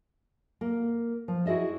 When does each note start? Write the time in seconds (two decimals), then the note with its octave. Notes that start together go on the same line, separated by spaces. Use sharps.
0.61 A#3
1.28 F3
1.46 E4 F#4 G#4 D#5 E5